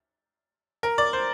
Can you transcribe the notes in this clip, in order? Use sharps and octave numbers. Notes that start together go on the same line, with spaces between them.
A#4
D5
C5